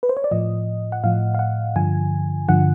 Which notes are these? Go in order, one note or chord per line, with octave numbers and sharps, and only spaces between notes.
B4
C5
C#5
D5
A2 F3 D#5
F#5
A2 F3 F5
F5
F#5
G2 D3 F3 G#5
G2 D3 F3 F#5